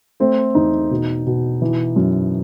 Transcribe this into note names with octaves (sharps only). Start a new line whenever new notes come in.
A3 C4
E2 D#4
B2
B2
E3
F#2